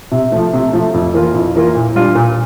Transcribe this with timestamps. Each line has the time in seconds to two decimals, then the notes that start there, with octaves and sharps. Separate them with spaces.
0.12 C3
0.32 F3 A3
0.54 C3
0.73 F3 A3
0.94 F2
1.14 E3 A#3 F4
1.34 F2
1.55 E3 A#3 F4
1.75 A#2
1.95 G3 D4 F4
2.15 A#2